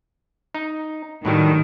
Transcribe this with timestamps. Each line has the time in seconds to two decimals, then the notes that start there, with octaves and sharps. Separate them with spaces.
0.54 D#4
1.25 A2 D#3 F#3 G3